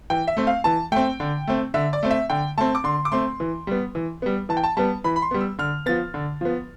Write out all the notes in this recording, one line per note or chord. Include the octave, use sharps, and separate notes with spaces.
E3 G5
E5
A3 C4
F5
E3 A5
A3 C4 G5
D3
A3 C4
D3 E5
D5
A3 C4
E5
D3 G5
A3 C4 A5
D6
D3 C6
D6
A3 C4 C6
E3
G3 B3
E3
G3 B3
E3 A5
G5
A5
G3 B3 A5
E3 B5
B5
C6
G3 B3
E6
D3 F6
F3 B3 A6
D3
F3 B3